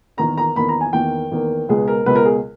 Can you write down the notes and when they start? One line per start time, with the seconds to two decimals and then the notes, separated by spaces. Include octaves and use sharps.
0.17 E2 D#3 A#3 A#5
0.38 A#5
0.55 E2 D#3 A#3 B5
0.69 A#5
0.81 G#5
0.93 E2 D#3 A#3 G5
1.31 E2 D#3 A#3
1.69 C#2 B2 G#3 B3 G#4
1.88 A#4
2.06 C#2 B2 G#3 B3 B4
2.16 A#4
2.25 G#4